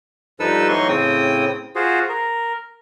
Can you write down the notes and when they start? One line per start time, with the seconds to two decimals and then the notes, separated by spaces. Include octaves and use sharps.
0.40 G2 F3 D#4 A4 B4 E6
0.69 E3 F#3 A3 D#4 C6 C#6
0.88 A2 C#3 C4 G5 D#6
1.76 F4 F#4 G#4 C5
2.09 A#4